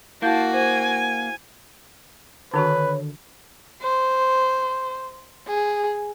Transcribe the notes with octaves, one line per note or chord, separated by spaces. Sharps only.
A#3 E4 F#4 F5 A5 G6
C5 G#5
D3 D#3 D4 F#4 B4 C#5
C5
G#4